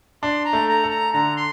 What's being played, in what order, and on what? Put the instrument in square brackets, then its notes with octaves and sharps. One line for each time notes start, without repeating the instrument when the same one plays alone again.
[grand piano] D4 [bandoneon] C6
[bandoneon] A#5
[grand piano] A3
[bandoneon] A#5
[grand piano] A4
[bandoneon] A#5
[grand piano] D3 [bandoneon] A#5
[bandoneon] C6